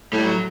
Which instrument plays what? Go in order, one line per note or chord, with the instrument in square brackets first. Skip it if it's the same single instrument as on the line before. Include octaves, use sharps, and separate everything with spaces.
[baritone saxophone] A2 [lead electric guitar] G3
[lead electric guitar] F#3